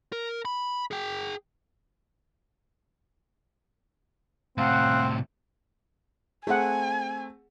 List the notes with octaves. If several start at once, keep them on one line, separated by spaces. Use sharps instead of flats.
A#4
B5
G#4 G5
A2 C3 C4 F5 F#5
A3 C4 G#4 F#5 G#5